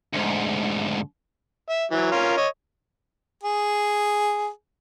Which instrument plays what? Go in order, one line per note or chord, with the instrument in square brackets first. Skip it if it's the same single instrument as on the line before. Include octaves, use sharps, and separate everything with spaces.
[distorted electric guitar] D2 G#2
[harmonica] E5
E3 F#3
C#4 F4 A#4
C#5 D#5
G#4